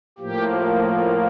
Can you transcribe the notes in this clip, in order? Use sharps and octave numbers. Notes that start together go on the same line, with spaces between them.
A2 F3 A#3 G4